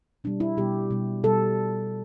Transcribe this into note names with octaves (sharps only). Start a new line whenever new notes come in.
B2 G3 D4
E4
B2 G3 G4
B2 G3
B2 G3 A4